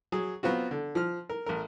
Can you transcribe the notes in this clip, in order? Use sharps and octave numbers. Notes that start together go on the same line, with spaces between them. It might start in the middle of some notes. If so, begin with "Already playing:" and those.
F#3 G#4
F#3 B3 C4 F4 F#4
D3
F3 F6
A#4
A1 A#4